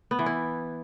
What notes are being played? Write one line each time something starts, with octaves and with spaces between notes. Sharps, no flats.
B3
E3
E4